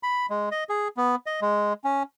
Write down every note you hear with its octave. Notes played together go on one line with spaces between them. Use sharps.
B5
G#3
D#5
G#4
B3
D#5
G#3
C#4